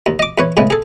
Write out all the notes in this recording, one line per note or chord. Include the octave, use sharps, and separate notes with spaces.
D#2
D#5 D6
E2 B4 C#5
A2 C#3 G#3 B3
G#4 A4